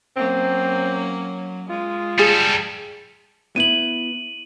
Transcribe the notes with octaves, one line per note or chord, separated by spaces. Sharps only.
F#3 A#3 C4 C#4
G#3 F4
G3 G#4 A4
B3 E4 D#7 F#7